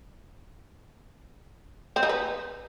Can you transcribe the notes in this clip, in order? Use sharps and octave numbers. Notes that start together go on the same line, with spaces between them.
C4
D#4
B4